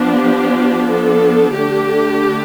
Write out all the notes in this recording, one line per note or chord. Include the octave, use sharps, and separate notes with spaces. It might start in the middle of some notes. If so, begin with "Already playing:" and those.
Already playing: F3 B3 D4
G4
A4
D3 A3 D4 G4